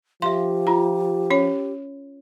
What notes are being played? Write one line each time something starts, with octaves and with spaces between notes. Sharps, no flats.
F3 G4 E5 F5 C6
F4 A#5
C#4 C#5